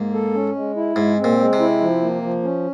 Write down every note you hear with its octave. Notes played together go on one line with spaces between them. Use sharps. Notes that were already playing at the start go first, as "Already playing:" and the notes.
Already playing: G#2 A#3
A4
C#4
G#3
E4
G#2 G#3
C4
A#2
G#3
C3
E4
F3
A#3
F3
C#4